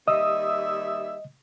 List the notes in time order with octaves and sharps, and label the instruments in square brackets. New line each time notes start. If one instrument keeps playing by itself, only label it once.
[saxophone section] D#2 G3 E5 [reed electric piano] D#5 [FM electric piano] D#6 E6